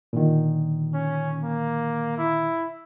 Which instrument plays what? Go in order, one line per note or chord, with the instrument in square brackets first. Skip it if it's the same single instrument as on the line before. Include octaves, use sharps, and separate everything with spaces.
[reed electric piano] A#2 D3 D#3
[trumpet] C#4
A#3
E4